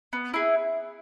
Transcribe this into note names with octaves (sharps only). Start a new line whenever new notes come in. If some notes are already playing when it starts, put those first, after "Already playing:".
B3
E4 G#4